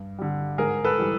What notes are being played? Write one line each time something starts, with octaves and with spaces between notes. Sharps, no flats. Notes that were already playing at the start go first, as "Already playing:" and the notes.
Already playing: G2
D3 G3
G#2 G#4 A#4
A4 B4
E3 G3